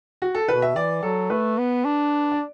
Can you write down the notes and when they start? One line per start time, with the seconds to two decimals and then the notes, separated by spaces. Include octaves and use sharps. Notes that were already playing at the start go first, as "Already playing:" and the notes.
0.22 F#4
0.35 A4
0.48 B2 B4
0.62 E5
0.76 E3 D5
1.03 F#3 A4
1.30 A3 B4
1.58 B3
1.85 D4
2.32 D5